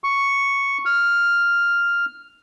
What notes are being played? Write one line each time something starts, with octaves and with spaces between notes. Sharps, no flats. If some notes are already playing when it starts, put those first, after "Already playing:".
C#6
F6